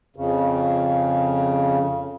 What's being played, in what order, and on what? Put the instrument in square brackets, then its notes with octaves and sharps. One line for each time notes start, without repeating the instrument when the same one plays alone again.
[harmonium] F2 C#3